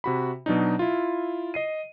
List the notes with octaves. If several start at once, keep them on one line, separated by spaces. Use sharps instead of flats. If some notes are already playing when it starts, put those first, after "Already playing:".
C3 F#4 B5
B2 F#3 D4 D#4
E4 F4
D#5 C7 D#7